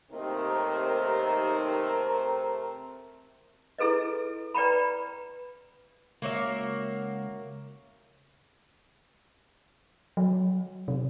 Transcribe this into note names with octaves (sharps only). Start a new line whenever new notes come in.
D#2 C3 D#3 A3 C4 A#4
E4 G#4 A4 B4 D#5
B4 D5 G5 A#5 B5
C#2 A#3 F#4 C#5 E5
F#3
C3